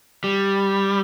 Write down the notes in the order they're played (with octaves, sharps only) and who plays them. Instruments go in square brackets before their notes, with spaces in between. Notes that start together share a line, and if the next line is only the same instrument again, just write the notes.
[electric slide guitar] G3